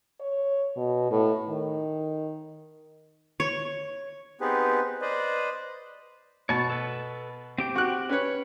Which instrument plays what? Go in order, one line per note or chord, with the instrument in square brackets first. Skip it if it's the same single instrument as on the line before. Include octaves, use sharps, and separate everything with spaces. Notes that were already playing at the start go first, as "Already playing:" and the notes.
[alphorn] C#5
B2
A2
D#3
[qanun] C#5
[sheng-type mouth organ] B3 C4 D#4 G4 G#4 B4
B4 C5 D5 D#5
[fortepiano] B2 [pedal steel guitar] C#5 A5
[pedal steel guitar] A4 B4
C4 G4 G5
[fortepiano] F#4 F#6
C#4 B4 C#5